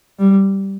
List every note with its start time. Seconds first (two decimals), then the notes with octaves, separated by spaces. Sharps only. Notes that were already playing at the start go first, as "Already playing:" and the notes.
0.19 G3